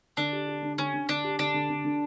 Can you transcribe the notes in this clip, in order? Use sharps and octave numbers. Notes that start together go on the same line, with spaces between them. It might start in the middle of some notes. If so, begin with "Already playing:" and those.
D3 D4
G4
G4
D3
D3 C#4
D3
D3 D4
G4
D3 D4
D3
D3
D3